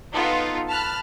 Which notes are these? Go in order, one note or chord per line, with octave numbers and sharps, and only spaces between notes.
B3 D#4 F4 A4
A5 B5 F6 F#6